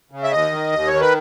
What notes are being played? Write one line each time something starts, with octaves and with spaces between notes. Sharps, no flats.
C#3
E5
D#2 D#5
D#3
D#2
C#5
D#3
B4